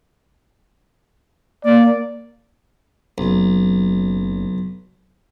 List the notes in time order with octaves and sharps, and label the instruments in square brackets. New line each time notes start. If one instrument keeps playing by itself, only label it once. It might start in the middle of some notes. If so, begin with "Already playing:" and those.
[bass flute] A#3 [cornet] D5
[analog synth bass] F#1 [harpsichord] B1